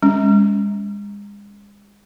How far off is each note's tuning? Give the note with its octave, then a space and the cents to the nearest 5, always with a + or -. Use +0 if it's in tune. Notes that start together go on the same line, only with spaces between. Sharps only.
G#3 -35 C#4 +5